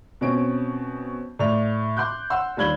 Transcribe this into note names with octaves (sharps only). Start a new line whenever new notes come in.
B2 C4 C#4 D7
A2 D5 F7
C6 D6 F#6 G6
F#5 C6 E6
D#2 G3 B5 G#6 F#7 G7